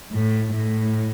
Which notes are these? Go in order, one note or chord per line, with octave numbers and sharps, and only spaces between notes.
A2
A2